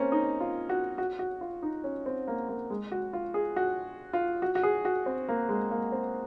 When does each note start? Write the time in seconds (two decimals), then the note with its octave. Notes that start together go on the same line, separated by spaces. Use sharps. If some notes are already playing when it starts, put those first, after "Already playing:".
Already playing: A#3 C4 C#4
0.12 D#4
0.41 F4
0.69 F#4
0.98 F#4
1.19 F#4
1.41 F4
1.63 D#4
1.84 C#4
2.06 C4
2.28 A#3
2.49 A#3
2.70 G#3
2.92 F#4
3.13 F4
3.34 G#4
3.56 F#4
4.13 F4
4.42 F#4
4.55 F#4
4.63 G#4
4.85 F#4
5.06 C4
5.29 A#3
5.49 G#3
5.71 A#3
5.92 C4